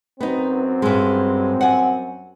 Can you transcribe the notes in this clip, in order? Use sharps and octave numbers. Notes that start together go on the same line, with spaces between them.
F#2 B3 C4 D#4
G2 G#3
F#5 G#5